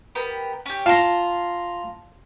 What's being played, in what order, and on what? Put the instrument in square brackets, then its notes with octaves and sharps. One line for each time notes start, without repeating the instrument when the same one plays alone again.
[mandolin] B3 G4 A#4
C#4 G4
[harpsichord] F4 A#5 [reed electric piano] F5 [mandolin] A5 C6